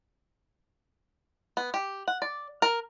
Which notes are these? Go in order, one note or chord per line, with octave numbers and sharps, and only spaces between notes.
B3
G4
F#5
D5
A#4